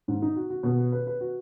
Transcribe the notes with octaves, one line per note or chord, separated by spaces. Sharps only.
G#2
D#4
F#4
F#4
B2
B4
B4
B4
F#4